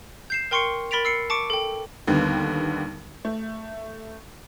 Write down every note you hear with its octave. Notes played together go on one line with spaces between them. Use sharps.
G6 C7 E7
A#4 G5 C6 C#6 C7 C#7
A#4 B5 A6 B6 D7 F7
E6 C7 C#7
A5 C#6 D6 C#7 D7
A4 G5
D#2 D3 G3 B3
A3